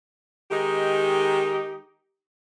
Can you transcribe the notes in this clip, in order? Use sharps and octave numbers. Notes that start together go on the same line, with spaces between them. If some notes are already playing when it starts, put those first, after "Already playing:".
D#3 G#3 D#4 G4